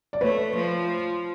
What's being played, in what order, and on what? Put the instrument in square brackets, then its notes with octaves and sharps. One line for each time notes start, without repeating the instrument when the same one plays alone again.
[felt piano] D5
[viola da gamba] A3 [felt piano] B4 C#5
[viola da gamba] F3